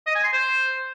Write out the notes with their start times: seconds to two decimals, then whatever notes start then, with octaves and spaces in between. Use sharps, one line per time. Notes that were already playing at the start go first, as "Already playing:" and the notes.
0.07 D#5
0.15 G#5
0.24 C6
0.33 C5